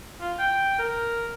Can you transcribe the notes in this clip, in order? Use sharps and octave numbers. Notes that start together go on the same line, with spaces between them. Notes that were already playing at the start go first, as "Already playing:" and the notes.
F4
G5
A#4